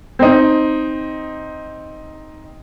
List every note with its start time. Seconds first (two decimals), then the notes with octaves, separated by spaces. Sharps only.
0.19 C4 D#4